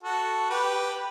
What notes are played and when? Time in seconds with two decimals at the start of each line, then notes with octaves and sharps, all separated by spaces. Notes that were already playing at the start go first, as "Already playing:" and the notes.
0.03 F#4 A4
0.50 G4 B4
0.90 B4